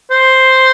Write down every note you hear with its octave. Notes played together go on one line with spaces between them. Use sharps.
C5